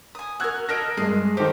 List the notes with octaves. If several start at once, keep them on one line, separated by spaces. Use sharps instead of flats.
G#5 D#6
F#4 A#4 E6 F#6 G#6
A4 A#4 D#5 A#6 D7
G2 G#3 G#4
D#3 G4 A4 C5